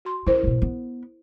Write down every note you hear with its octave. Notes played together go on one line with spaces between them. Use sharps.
F#4 C6
C#3 E4 A#4 C5
G#1 B2
B3